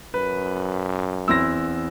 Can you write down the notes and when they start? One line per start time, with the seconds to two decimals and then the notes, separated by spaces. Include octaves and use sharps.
0.14 F#2 B4
1.28 E2 C4 E4 E6 A#6